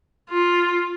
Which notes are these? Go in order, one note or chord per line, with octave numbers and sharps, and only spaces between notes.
F4